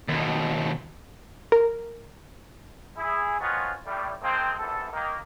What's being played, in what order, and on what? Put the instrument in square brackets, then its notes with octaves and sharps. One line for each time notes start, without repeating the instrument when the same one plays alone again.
[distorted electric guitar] D#2 B2
[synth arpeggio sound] A#4
[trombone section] E4 G#4
D#3 F3 B3 C#4 F4 F#4
A2 G3
F3 G#3 A#3 C4
A#1 E2 C3 A4
D#3 A#3